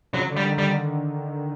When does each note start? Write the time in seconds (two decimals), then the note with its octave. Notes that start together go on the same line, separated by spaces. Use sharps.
0.14 C#3 F#3
0.29 D3
0.37 G3
0.43 D#3
0.58 D3 G3